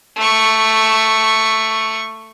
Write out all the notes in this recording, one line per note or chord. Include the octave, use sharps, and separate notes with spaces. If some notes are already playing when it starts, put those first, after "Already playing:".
A3 C#6